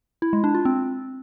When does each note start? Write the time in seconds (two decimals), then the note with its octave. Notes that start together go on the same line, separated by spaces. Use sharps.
0.22 E4
0.33 G#3
0.44 D4
0.55 F4
0.65 C4